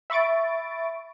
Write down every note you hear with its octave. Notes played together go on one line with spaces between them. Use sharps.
E5 B5 C#6 A6 D7